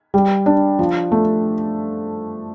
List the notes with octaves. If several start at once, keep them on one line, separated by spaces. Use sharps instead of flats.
G3
D4
F3
A3